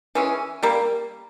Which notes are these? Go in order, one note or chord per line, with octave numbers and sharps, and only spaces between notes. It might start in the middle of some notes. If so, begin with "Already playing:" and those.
E3 G#3 C#4
G3 A#3